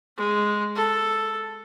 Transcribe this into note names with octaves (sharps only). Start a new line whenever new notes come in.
G#3
A4